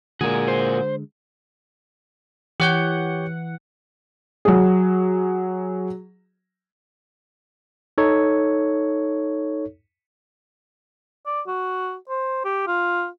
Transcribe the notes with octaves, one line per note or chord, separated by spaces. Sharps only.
A#2 D3 G#3 F#4 G#4 A#4
C5
E3 G4 C#5 F#5 G6
F#3 G#4
D#4 A4 C#5
D5
F#4
C5
G4
F4